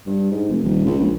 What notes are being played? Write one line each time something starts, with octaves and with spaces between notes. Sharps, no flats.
G2
G#2
F1
D#1
C#2
A#1